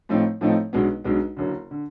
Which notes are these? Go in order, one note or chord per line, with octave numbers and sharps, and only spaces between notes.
A2 F3 A3 C4 D#4
A2 F3 A3 C4 D#4
B1 B2 G#3 B3 D4
B1 B2 G#3 B3 D4
F#1 F#2 D3
D3